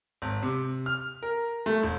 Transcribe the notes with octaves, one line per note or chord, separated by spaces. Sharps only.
G#1
C3
F6
A#4
A3
E1